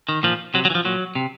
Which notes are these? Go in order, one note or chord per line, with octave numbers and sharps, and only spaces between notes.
D#3
A#2 F3
C3 F#3
F#3
E3
F3
A#2 F#3
C3